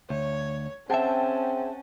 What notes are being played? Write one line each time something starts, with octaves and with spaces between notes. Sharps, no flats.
D2 C#5
C4 C#4 G#4 E5 F#5 G5 A5